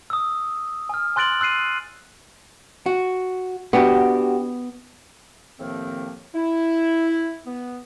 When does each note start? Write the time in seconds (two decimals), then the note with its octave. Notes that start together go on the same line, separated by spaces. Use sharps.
0.10 D#6 E6
0.89 G#5 F6
1.16 G#5 C6 F#6 A6 D7 F#7
1.40 C6 E6 F#6 C7 D#7
2.86 F#4
3.73 B3 D4 F#4 G4
5.59 A2 C3 D#3 F3 A#3 C4
6.34 E4
7.46 B3